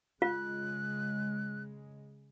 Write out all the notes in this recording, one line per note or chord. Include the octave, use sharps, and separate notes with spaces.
C#3 G#3 F4 F#6